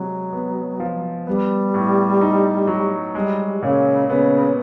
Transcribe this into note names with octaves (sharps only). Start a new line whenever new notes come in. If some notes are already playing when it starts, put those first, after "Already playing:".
Already playing: C3 F#3 G#3
B3
F3
G3 B3
A2
D#4
F#3
G3 G#3
A#2 C#3
C#3 B3